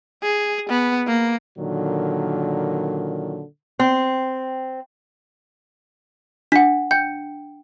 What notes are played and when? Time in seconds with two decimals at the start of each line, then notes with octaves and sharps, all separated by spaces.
0.23 G#4
0.69 B3
1.07 A#3
1.59 A#2 D3 D#3 F#3
3.79 C4
6.52 D4 F#5 B6
6.91 G5 G6